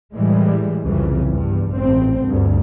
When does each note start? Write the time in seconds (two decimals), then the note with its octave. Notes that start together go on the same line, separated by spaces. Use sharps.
0.13 A2 E3 G3 G#3
0.84 C2 F2 C#3 E3
1.28 E2 G2
1.74 A1 C4
2.28 D2 G2